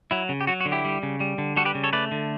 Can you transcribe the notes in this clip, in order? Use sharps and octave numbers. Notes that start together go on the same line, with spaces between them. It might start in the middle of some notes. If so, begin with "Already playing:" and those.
F#3 E4
C#3
G4
F#3 F#4
F#4
D3
E4 G4
G3
C#3
G3
D3
G3 F#4 A4
G4 B4
C#3
A4 C#5
A3 B4 D5
D3